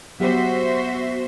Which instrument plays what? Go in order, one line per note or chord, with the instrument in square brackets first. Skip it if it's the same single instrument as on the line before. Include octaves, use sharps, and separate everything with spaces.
[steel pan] F#3 G4 [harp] B3 [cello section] F#4 C5 E5